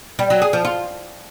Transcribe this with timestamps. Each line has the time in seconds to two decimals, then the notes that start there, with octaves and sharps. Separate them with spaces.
0.19 G3
0.30 F#3
0.42 G#4
0.53 F3
0.65 F4